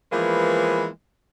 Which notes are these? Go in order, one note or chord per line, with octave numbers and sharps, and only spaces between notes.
E3 F3 G#3 A#3 B3